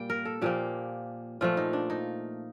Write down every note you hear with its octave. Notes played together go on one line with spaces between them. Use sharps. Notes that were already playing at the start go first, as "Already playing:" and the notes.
Already playing: A#2 G3 A#3 G5
A#4
A4
A#2 F3 A#3 G4
A#2 F3 A3 F4
D#4
D4
D#4